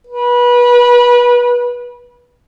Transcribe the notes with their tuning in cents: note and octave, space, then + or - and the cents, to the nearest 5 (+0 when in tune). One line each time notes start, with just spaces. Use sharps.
B4 -25